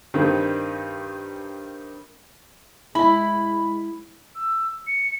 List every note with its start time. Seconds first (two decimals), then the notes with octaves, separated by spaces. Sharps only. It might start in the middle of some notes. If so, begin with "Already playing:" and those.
0.14 G2 D#3 C4
2.95 G#3 E4 B5
4.35 E6
4.87 C#7